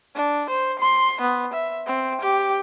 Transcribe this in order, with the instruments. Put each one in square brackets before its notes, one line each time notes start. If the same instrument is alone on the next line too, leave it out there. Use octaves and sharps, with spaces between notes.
[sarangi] D4
C5
C6
B3
E5
C4
G4